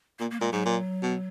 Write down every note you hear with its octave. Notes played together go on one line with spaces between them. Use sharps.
A#2 A#3
A#3
A#2 G#3
G#2 F#3
A#2
B2